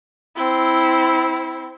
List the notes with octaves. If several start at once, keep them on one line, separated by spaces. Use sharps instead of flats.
C4 E4